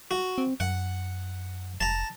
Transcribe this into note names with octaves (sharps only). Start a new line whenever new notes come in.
F#4
C4
F#2 F#5
F1 A5 A#5